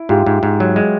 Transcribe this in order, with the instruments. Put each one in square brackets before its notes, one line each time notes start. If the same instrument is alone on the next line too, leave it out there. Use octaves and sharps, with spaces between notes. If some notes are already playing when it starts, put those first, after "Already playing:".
Already playing: [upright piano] E4
[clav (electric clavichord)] G#2 [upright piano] F4 G4
[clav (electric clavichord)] G#2
G#2
F#3
G#3